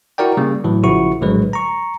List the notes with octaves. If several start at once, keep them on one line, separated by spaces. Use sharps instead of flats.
E4 F#4 A#4 D5 G5
C#3 G3 A#3
A2 E3 F#3
A#1 C#3 F3 E4 F#4 C#6
A#1 A2 D3 F#3 G#3 B4
A#5 C#6